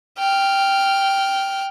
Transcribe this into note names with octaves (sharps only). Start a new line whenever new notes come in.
G5 F6